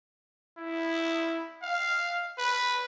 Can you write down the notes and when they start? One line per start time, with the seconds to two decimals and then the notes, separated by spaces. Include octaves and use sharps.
0.58 E4
1.62 F5
2.38 B4